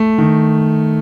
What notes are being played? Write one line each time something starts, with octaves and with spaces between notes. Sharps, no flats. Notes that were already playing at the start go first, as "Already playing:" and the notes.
Already playing: A3
D#3